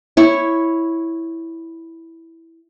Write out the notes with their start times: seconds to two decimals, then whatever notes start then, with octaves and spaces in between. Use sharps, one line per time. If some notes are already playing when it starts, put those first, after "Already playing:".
0.17 E4 C#5